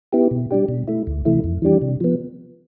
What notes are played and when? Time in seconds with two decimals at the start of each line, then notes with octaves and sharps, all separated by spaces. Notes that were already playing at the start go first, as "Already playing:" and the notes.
0.13 B3 E4 G4
0.31 B2
0.51 G3 D4 G4
0.68 B2
0.88 A3 E4
1.07 D2
1.25 C3 E3 A3 E4
1.44 F2
1.62 E3 G3 D4 G4
1.82 C3
2.01 F3 B3